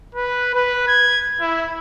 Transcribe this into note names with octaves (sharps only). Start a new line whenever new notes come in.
B4
B4
G#6
E4